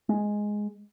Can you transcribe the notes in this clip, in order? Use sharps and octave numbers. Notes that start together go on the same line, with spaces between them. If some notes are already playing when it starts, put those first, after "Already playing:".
G#3